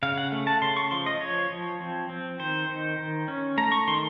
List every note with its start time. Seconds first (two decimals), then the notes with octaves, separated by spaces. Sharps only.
0.03 C#3 F5
0.18 F#5
0.32 A3
0.47 A5
0.62 C#3 C6
0.77 C#6
0.91 F3 C6
1.06 D#5
1.21 F3 C#5
1.50 F3
1.81 C4
2.10 C4
2.39 D#3 C5
2.69 D#3
2.98 D#3
3.28 C#4
3.57 A3 A#5
3.72 C#6
3.87 D#3 C6